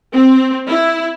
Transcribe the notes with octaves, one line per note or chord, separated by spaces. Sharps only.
C4
E4